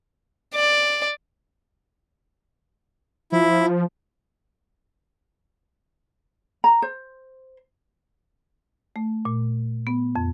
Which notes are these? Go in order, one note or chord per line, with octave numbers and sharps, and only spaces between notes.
D5
F3 E4
A#5
C5
A3
A#2
B3
F2